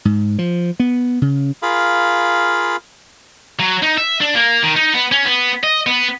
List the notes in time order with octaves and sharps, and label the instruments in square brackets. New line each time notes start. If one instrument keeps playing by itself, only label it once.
[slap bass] G#2
F3
B3
C#3
[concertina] F4 G#4 A#4 F5 B5
[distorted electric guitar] F#3
D#4
E5
D4
A#3
D#3
D#4
B3
C#4
B3
D#5
B3